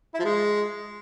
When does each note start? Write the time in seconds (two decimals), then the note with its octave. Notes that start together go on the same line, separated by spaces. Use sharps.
0.14 E4
0.19 F3
0.24 G#3